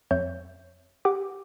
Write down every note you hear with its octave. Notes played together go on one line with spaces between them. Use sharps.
F2 C#5 E5 G6
G4 F#5 D6